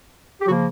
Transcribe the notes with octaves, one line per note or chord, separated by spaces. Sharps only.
G4
C#3 F3 F#3 A#3 F#4